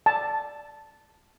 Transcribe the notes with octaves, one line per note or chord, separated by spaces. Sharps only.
A5